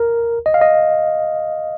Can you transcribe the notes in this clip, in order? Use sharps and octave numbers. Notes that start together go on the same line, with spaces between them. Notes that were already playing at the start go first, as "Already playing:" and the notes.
Already playing: A#4
D#5
F5
D#5